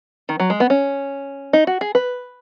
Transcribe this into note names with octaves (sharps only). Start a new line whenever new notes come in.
D#3
F#3
G#3
B3
C#4
D#4
F#4
G#4
B4